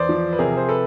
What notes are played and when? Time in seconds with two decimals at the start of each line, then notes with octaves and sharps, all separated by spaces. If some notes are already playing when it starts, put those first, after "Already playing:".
Already playing: E2 C5 D5
0.09 F3
0.33 B4
0.39 C3 G#4 A#4
0.57 C5
0.68 A4 B4